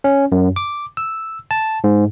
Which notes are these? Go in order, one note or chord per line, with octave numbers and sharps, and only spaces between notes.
C#4
F#2
D6
E6
A5
G#2